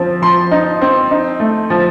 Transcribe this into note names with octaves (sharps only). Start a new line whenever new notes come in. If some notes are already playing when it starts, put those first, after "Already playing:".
Already playing: F3 C4
F3 C6
D#4
C4
D#4
A3
F3